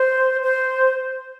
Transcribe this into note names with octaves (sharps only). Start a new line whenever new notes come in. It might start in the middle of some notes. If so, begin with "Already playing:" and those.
Already playing: C5
C5